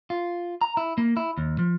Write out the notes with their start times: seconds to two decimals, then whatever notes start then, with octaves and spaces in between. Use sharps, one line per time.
0.10 F4
0.61 A#5
0.77 E4
0.98 A#3
1.17 E4
1.38 D#2
1.59 F3